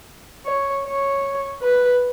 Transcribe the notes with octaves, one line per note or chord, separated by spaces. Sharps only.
C#5
C#5
B4